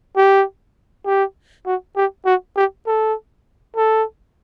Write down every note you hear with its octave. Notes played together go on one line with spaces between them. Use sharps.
G4
G4
F#4
G4
F#4
G4
A4
A4